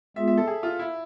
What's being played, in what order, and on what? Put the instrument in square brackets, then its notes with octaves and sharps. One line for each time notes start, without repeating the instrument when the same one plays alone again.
[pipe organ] G#3 B3 F4 G#4 [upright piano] E5
[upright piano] E5
A4
G#4
F4
E4